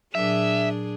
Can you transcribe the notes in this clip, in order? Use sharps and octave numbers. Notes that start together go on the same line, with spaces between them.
A#2 F#3 D4 G#4 E5